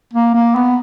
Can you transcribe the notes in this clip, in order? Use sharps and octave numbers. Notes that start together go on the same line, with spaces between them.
A#3
A#3
B3